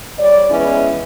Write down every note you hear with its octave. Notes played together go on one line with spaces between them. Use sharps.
G3 C#5 D5
E3 G#3 B3 C#4 E4